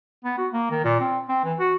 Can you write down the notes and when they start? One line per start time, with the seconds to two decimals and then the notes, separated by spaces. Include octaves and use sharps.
0.24 B3
0.38 F#4
0.53 A#3
0.71 D#3
0.84 A#2
1.00 C4
1.29 C4
1.44 E3
1.59 F#4